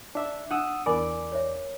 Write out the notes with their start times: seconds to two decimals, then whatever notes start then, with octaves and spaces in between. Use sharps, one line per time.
0.15 D4 E5
0.51 D4 F#5 D#6 E6
0.86 E2 A#4 D5 G#5 B5 D6
1.32 C#5 E5